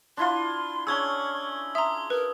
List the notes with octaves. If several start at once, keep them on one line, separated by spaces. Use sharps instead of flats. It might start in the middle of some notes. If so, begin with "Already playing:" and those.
D4 E4 F4 C6
C#4 D4 G#4 C#6 E6 G#6 G7
E5 A#5 C6 D#6
A#4 B4